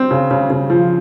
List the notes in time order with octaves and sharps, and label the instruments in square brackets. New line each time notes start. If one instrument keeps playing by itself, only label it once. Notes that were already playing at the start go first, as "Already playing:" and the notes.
Already playing: [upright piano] C4
C#3
C#3
C#3
F3